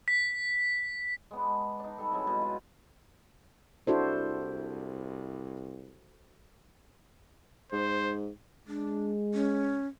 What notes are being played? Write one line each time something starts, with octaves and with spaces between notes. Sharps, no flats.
B6
G#3 B3 D4
D4 D#4
G3 A4
C3 E3 F#3 G#3
B2 B4
F4
C2 D4 E4 F#4 A4 C5
G#2 C5
G#3 D4
C#4